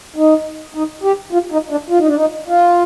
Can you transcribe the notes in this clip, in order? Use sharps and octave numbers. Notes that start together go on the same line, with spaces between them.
D#4
D#4
G4
F4
D#4
D4
F4
D#4
D4
D#4
F4